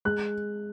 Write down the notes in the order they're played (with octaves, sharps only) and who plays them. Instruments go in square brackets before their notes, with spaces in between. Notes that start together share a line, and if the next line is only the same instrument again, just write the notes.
[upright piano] G#3 F#6